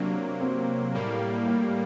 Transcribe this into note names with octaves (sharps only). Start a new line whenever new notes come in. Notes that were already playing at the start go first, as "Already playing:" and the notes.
Already playing: C3 F#3 A#3 D4
C4
A2 G3 A#3
A#3